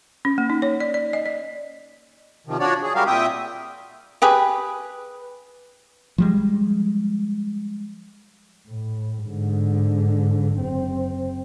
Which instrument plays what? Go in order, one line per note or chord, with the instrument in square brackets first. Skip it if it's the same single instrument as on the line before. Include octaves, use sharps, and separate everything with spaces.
[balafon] C#4
A#3
D#4
C#5
D5
D5
D#5
D5
[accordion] C3 D#3 F3
F3 D4 F#4 C#5 D5
G#4
G3 G#3 F#4 G4 A#4 F5
A#2 C4 E5 G5 D#6
[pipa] G4 G#4 B4
[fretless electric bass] F3 G3 G#3
[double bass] A2
G#2 D3
F#1 C4